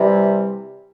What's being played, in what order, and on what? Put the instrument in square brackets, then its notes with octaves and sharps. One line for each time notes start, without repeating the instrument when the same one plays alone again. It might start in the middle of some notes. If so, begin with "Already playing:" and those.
Already playing: [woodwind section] C3 E3 G3